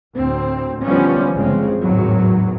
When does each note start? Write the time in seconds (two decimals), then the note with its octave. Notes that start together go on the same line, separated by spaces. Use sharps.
0.16 D2 A2 C4
0.83 D3 E3 F3 G3 B3 C#4
1.33 G1 C#3 F3 G#3 C4
1.81 G#1 E2 A2 F#3